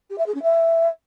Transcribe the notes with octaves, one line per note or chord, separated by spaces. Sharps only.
G4
E5
G#4
C#4
E5